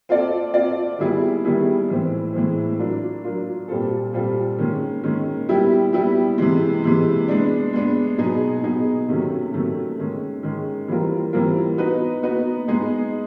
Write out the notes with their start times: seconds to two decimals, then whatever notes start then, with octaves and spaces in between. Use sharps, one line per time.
0.09 C4 F4 A4 D5
0.53 C4 F4 A4 D5
0.99 D#3 G3 B3 E4 G#4
1.44 D#3 G3 B3 E4 G#4
1.89 A2 E3 G#3 C4
2.34 A2 E3 G#3 C4
2.78 F#3 A#3 D4 F4
3.24 F#3 A#3 D4 F4
3.68 A#2 G3 C4 F4 A4
4.13 A#2 G3 C4 F4 A4
4.59 D#3 G#3 C#4
5.04 D#3 G#3 C#4
5.49 G3 B3 E4 G4
5.93 G3 B3 E4 G4
6.38 C3 E3 G#3
6.84 C3 E3 G#3
7.28 G#3 B3 D4
7.73 G#3 B3 D4
8.18 B2 F#3 B3 D#4 G#4
8.63 B2 F#3 B3 D#4 G#4
9.09 C3 D#3 F#3 A3 C#4
9.53 C3 D#3 F#3 A3 C#4
9.99 D#3 G#3 C#4
10.43 D#3 G#3 C#4
10.88 E3 G3 C4 F4 A#4
11.33 E3 G3 C4 F4 A#4
11.78 B3 D#4 F#4 B4
12.23 B3 D#4 F#4 B4
12.68 G#3 B3 D#4 G#4